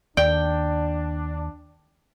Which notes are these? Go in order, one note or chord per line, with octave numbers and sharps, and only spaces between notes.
D#2 D4 D5 G5